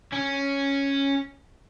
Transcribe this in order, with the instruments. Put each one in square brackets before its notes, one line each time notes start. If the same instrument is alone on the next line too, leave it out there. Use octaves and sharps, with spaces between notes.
[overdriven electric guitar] C#4